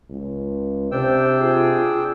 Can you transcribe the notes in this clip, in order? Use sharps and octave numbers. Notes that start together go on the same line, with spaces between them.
C#2
C3 D4 C5 G5 E6
F4 G#4